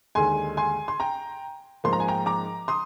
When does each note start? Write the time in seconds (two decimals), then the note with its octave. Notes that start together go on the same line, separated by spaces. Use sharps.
0.15 D#2 D3 G#3 G#5 C6
0.57 G#5 C6
0.88 C6
1.00 G5 A#5
1.84 G#2 F3 A#3 C6
1.93 A#5
2.00 G#5
2.08 G5 A#5
2.26 A#5 D6
2.68 C6 D#6